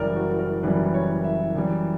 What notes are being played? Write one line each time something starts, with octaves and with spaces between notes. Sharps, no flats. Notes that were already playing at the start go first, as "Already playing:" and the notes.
Already playing: F#1 F#2 E3 G3 A#4 D5
F#4
A#4
F#1 F#2 E3 G3 B4
C#5
E5
F#2 E3 G3